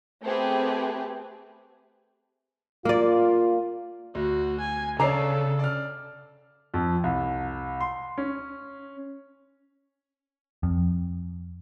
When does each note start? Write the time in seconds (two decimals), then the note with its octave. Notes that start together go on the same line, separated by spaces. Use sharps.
0.23 A3 B3 C4 G4 G#4 B4
2.85 A#3 F4 D5
4.15 D2 F#4
4.60 G#5
5.00 C#3 D4 A4 C#5 D#5 A#5 D6 C7
5.59 D5 F6
6.74 F2
7.04 C2
7.81 C6
8.18 C#4
10.63 F2